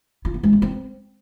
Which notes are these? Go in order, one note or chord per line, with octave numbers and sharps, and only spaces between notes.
F4
B3
G#3
B3
C4